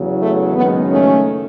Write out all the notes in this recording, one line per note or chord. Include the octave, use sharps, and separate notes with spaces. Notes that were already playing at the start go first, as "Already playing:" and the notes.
Already playing: E2 C#3 F#3
A3
F#1 F#2 D#3 G#3 B3
A3 C#4